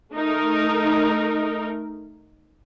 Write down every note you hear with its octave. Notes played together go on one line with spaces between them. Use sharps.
A3 D#4 A#4